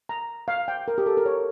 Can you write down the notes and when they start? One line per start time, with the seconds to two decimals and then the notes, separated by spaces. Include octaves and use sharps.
0.09 A#5
0.48 F5
0.68 G5
0.88 A#4
0.98 G4
1.06 A4
1.17 A#4
1.26 C#5